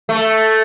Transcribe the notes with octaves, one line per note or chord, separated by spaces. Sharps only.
A3